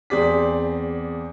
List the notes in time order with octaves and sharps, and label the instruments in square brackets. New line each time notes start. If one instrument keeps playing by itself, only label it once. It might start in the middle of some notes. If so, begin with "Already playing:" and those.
[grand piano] E2 C4 G#4 D5 B6